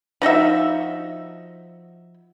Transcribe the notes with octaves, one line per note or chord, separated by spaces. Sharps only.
F3 D#4 F#4 E5